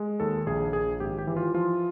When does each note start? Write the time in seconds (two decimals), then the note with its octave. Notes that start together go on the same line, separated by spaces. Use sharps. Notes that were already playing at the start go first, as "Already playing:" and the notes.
Already playing: G#3
0.20 D#2 A4
0.46 A#1 G#4
0.73 A#1 G#4
1.00 G#1 G4
1.19 G4
1.27 E3
1.37 F4
1.54 F3 F4